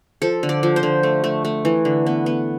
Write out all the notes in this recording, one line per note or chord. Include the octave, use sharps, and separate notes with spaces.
F3 A4
D3
D5
F3
C5
D3
A3
A3
A3
E3
D3
B3
B3